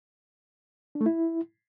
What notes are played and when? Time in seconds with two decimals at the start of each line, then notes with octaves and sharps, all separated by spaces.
0.95 D4
1.01 A3
1.06 E4